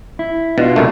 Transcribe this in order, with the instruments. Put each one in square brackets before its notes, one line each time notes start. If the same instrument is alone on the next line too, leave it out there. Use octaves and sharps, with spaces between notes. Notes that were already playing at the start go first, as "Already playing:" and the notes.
[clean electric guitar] E4
[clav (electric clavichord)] B2 [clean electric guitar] D4 F4
[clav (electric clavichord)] C2 A#2 A3